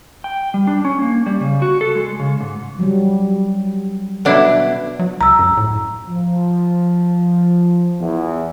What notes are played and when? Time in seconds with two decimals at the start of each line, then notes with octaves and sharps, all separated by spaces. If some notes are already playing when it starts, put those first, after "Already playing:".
0.24 G5
0.54 G3
0.67 D4
0.85 C#4
1.02 A#3
1.26 G3
1.40 C#3
1.62 F#4
1.81 A4
1.95 G#3
2.20 C#3
2.41 G#2
2.79 F#3 G3
4.25 B2 D4 E4
4.99 F#3
5.21 C#2 A#5 E6
5.39 F#2
5.57 A2
6.08 F3
8.00 E2